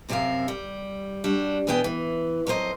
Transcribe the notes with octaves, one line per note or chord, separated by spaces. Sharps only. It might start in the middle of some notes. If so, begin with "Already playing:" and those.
F#2 C3 C4 G4 A#4 F5
G3
G3 D4 F#4
B2 E3 B3 G#4 G5
E3
F2 F#3 A#4 C5 D#5